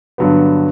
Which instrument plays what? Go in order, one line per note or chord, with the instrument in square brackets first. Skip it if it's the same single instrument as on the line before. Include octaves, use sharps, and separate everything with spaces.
[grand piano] G2 D3 F#3 B3